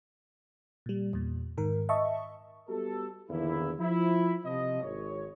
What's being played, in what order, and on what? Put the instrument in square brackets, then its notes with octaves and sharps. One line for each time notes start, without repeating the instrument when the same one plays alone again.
[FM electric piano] A#2 G3
E2 A#2
G#2 D#3 A#4
D#5 E5 A5 C#6
[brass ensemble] G3 B3 F#4 G4 A4
A#1 E2 D3 D#3 A#3 E4
F3 E4
C3 F3 D#5
G#1 C#5